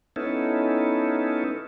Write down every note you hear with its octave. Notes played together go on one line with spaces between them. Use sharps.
B3 C#4 D#4 E4 A4